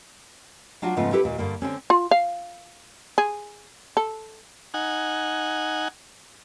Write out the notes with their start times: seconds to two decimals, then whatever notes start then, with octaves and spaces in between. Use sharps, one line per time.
0.82 F#3 D4 F4 F#4
0.97 G#2 C#3 F3 A3 B3 F4
1.12 E4 G4 A4 B4
1.24 D#2 A#2 A#3
1.38 G2 D3 A#3
1.62 D3 C4 C#4
1.90 F4
2.11 F5
3.18 G#4
3.97 A4
4.74 D#4 F#5 G#5